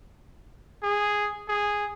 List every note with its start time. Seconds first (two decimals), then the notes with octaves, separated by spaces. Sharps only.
0.83 G#4
1.48 G#4